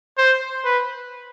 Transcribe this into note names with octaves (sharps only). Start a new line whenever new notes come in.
C5
B4